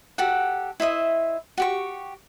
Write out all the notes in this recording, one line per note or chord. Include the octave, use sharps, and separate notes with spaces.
F#4 G4 A4 F#5
E4 C5 D#5 E5
F#4 G4 C#6